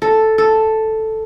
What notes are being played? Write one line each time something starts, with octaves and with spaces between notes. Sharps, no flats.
A4
A4